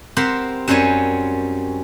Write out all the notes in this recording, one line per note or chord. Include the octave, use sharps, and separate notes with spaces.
C4 G4 A#4 C5 F#5 B5
F#2 G3 C4 C#4 C#5 G#5